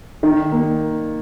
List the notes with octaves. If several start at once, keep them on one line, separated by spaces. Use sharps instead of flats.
D#3
A#3